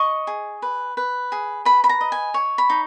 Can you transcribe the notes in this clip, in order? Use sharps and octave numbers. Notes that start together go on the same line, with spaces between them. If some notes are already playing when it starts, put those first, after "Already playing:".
Already playing: D#5 C#6
G#4
B4
B4
G#4
B4 B5
B5
A#5
D#5
G#5
C#5
B5
D#4